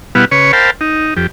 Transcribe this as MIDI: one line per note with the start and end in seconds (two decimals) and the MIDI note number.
0.15 0.25 47
0.15 0.25 55
0.15 0.25 59
0.15 0.25 64
0.15 0.25 77
0.15 0.25 78
0.31 0.52 49
0.31 0.52 71
0.31 0.52 73
0.31 0.52 85
0.53 0.71 70
0.53 0.71 72
0.53 0.71 77
0.53 0.71 79
0.53 0.71 81
0.53 0.71 83
0.81 1.14 63
1.17 1.27 41
1.17 1.27 67